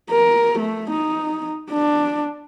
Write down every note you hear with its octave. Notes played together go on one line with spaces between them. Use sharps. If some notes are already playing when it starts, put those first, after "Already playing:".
A#4
A3
D#4
D4